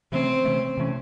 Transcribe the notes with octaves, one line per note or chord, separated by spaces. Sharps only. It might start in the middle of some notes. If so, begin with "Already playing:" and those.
C3 E3 A3 C4 C#4
C3 E3 A3 C#4
C3 E3 A3 C#4